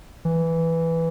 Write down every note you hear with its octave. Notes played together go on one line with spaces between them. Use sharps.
E3